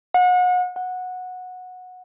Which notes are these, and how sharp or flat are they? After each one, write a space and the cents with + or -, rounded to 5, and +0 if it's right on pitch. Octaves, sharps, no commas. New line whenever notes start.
F#5 -35
F#5 -15